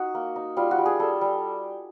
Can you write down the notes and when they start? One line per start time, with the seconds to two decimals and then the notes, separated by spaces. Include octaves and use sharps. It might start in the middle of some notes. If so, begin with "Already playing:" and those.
Already playing: D#4 F#4
0.15 A#3
0.36 D#4
0.57 G3 F4
0.71 F#4
0.78 G3
0.86 G#4
0.99 G3 A4
1.21 G3